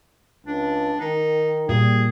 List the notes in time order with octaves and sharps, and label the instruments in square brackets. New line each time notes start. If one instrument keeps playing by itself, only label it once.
[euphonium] C#2 [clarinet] D4
[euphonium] D#3 [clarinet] D#4
[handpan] A#2 [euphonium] G3 [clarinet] G#4